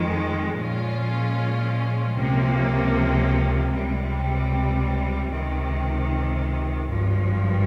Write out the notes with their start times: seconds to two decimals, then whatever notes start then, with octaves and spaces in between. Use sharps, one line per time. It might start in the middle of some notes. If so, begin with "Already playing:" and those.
Already playing: F2 D#3 G#3
0.57 A#2 F3 G#3 C#4 F4
2.15 C#2 C3 F3 A#3
3.72 C#2 C3 G3
5.30 C#2 C3 D#3
6.87 G#1 G2 F3